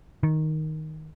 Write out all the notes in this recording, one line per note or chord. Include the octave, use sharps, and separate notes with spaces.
D#3